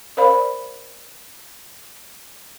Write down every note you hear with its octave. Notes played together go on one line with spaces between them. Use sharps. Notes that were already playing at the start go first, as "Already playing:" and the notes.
A#4 C5 D5 F5 B5